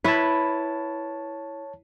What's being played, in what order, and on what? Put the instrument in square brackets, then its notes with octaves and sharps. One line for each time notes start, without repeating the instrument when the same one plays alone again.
[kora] E4 B4 [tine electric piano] C#5 A5